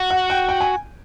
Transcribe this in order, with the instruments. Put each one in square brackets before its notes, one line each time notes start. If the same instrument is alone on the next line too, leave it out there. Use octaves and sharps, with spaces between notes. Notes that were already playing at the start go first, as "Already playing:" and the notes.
Already playing: [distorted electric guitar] F#4
[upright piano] F#5
G5
G5
G#5